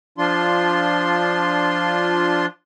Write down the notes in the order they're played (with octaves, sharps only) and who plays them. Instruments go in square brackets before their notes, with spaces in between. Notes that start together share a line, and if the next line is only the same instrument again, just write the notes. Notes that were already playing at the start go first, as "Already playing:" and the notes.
[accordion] F3 D4 F4 C6